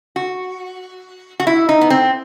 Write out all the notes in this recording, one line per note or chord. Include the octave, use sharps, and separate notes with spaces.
F#4
F#4
E4
D#4
B3
C4